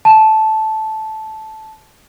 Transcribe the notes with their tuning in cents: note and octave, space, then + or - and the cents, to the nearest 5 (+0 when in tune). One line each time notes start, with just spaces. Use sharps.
A5 -10